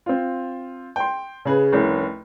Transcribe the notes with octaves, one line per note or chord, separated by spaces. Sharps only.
C4 F4
G5 C6
C#3 G#4 B4
F1 C2 C#4